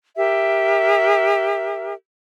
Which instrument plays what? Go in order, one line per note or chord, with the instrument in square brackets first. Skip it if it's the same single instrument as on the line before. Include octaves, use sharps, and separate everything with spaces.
[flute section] G4 A#4 E5